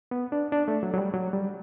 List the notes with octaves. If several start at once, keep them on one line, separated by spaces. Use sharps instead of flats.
B3
D4
D4
A3
F#3
F#3
G3
F#3
G3